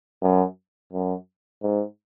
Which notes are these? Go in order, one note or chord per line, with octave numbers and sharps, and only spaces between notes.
F#2
F#2
G#2